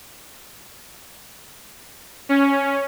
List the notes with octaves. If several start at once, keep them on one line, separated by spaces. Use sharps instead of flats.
C#4